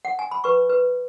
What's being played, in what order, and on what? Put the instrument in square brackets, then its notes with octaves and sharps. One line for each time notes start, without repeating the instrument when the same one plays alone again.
[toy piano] F#5
G#5
B5
B4 C#6
B4